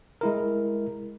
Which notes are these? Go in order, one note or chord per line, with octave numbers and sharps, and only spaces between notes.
G#3 E4 A#4